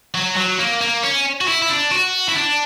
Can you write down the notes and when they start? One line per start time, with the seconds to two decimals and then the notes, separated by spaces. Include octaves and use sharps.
0.15 F#3
0.37 F#3
0.59 A#3
0.81 A#3
1.03 C#4
1.41 F#4
1.48 E4
1.62 E4
1.69 D4
1.92 F#4
2.29 E4
2.36 D4